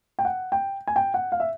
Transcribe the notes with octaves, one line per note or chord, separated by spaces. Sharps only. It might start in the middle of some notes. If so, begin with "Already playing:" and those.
G5
F#5
G5
G#5
G5
F#5
F5
E5